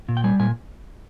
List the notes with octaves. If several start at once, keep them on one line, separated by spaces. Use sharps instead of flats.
A#2
G5
G3 G#5
A#2 G#5